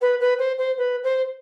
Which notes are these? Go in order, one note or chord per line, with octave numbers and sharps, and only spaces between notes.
B4
B4
C5
C5
B4
C5